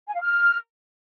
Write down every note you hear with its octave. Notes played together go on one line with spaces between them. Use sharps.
G#5
F5
F6